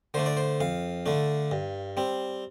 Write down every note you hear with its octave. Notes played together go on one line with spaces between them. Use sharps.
D3 A3 D4 C5
D5
C5
F2 F5
D3 A3 D4
G2
G3 C4